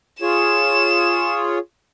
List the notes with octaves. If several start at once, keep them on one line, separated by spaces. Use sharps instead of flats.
F4 G#4 C#5 E7